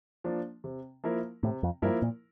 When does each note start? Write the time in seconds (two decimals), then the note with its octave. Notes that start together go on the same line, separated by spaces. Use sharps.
0.24 F3 A#3 D4
0.64 C3
1.04 F3 A#3 E4 A#4
1.43 A2 C3
1.63 F2
1.82 G2 F3 A#3 E4 A#4
2.02 A#2